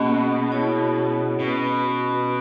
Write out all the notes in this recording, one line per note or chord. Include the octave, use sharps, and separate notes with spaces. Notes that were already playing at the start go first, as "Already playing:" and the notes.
Already playing: B2 A#3 C#4 G#4 D#5
E4 G#4 C#5
B2 C#4 F#4 B4